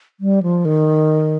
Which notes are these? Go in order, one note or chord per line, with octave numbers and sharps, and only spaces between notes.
G3
F3
D#3